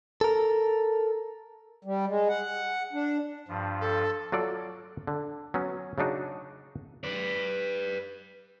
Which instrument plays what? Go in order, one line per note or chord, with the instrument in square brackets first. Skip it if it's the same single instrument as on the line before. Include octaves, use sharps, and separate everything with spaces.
[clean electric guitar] A4 A#4
[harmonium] G3
G#3
F#5
D4
[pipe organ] G2 F3
[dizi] A4
[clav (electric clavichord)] F#3 F4 A4 D5
D3
F#3 B3 C#4
C#3 F#3 D4 D#4 F#4
[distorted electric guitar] B4 D5